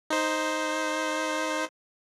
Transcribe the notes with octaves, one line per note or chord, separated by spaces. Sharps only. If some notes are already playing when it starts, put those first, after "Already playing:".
D#4 C5